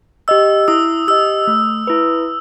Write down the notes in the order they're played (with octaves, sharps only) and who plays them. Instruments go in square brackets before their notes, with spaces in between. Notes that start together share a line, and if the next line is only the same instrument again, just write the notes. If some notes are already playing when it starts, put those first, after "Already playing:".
[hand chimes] G4 D#5 [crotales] E6
[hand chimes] E4 [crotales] D#6
[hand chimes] G4 D#5 [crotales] E6
[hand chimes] A3
E4 B4